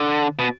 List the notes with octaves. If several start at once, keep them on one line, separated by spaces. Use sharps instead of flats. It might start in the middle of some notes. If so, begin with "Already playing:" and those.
Already playing: D3
B2